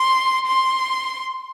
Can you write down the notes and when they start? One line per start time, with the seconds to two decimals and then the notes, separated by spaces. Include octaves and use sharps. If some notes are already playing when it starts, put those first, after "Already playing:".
Already playing: C6
0.46 C6